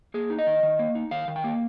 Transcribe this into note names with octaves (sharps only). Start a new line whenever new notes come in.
A#3 G#4
D#4
D#5
D#3
D#3
A#3
D#4
D#3 F5
D#3
G5
A#3